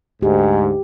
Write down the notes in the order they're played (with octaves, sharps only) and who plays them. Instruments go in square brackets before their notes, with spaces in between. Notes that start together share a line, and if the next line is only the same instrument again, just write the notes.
[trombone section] D2 G#2 [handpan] G4